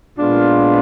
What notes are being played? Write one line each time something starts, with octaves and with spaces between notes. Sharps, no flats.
A#2 G#3 B3 D4 F4